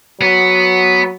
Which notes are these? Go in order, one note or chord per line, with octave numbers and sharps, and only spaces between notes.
F#3 B3